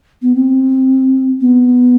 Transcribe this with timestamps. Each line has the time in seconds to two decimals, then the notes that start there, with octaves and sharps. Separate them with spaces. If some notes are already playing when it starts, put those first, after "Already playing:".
0.22 B3
0.35 C4
1.41 B3